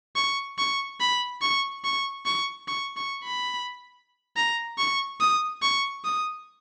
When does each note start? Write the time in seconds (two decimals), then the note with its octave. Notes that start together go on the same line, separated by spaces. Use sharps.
0.16 C#6
0.58 C#6
1.00 B5
1.42 C#6
1.84 C#6
2.26 C#6
2.68 C#6
2.97 C#6
3.24 B5
4.36 A#5
4.78 C#6
5.20 D#6
5.62 C#6
6.05 D#6